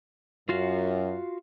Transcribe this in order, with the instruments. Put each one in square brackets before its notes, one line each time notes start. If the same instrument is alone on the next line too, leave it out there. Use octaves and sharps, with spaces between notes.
[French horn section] F#2 [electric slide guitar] F4 F#4 F5